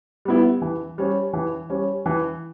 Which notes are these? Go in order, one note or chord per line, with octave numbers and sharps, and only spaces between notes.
G3 B3 E4
E3
G3 C#4
E3
G3 C#4
E3